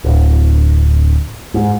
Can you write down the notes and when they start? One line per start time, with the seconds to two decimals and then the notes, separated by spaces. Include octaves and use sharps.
0.04 D1
1.54 G#2